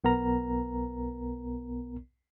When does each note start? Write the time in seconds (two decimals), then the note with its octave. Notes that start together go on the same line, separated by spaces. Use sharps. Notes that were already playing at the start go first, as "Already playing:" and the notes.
0.04 B1 B3 A#4 A#5